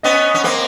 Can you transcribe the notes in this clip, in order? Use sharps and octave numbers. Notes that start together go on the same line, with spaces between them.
B3 C#4 D#5
C#4
A#3 C4